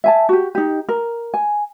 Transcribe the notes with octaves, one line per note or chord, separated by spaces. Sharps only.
E5 G#5 A5
F#4 G4
D#4 G4
A#4
G#5